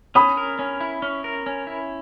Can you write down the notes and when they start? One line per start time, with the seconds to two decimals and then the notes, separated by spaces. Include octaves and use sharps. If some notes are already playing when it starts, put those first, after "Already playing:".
0.15 C#4 B5 D#6
0.37 A#4
0.59 C#4
0.80 E4
1.02 C#4
1.24 A#4
1.46 C#4
1.67 E4